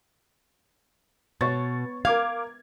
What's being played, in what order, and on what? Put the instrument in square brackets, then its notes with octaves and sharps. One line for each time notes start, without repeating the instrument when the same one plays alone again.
[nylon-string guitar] B2 [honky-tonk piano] C#5 C#6 A6
[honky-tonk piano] A#4 D6 G#6 [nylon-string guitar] F5